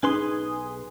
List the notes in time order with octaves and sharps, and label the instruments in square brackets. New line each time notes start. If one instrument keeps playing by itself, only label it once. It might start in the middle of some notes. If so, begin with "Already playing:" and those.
[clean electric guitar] B1 B4 C6 [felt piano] D#4 G#4 [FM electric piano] G#5 D#6